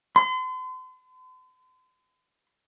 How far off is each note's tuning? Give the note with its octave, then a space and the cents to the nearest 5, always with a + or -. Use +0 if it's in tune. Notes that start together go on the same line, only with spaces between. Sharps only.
C6 -40